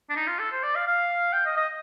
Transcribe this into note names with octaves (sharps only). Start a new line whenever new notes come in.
D4
D#4
F4
A4
C5
D5
F5
F5
G5
D#5
D#5